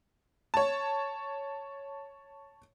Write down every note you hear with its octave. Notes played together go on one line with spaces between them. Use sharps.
C#5 A5